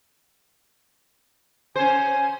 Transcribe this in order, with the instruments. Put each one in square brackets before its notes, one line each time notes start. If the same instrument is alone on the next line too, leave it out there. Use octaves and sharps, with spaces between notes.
[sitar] C#4 C5 [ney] G#5